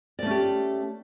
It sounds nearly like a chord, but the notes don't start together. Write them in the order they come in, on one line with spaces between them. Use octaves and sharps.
D5 A3 C#4 G4